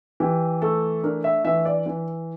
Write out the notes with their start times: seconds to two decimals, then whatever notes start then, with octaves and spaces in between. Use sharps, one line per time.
0.20 E3 G4
0.62 A3 A4
1.03 D4 A#4
1.24 E5
1.44 E3 E5
1.65 D5
1.86 E3